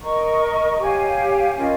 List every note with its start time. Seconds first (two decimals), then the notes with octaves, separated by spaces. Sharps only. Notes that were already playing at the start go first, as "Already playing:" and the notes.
0.01 A#4 D#5 A#5 C#6
0.79 G4 C#5 F5 G#5
1.56 C#4 F4 A#4 D#5